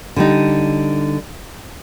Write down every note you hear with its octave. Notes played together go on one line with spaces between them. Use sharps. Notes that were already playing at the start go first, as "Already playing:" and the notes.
D3 G3 D#4